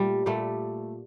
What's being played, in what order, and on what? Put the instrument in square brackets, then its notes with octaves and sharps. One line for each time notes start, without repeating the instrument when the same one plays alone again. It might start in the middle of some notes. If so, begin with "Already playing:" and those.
Already playing: [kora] A#2 G3 A3
A#2 G3 A3